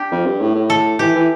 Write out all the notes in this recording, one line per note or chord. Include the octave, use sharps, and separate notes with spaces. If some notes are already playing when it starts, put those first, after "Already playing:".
Already playing: D4 G4
F2
G2
A2
A2
A4
E3 G4
E3